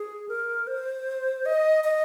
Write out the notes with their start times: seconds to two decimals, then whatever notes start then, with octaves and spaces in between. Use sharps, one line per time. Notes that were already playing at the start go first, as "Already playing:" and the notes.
Already playing: G#4
0.29 A#4
0.67 C5
1.46 D#5
1.84 D#5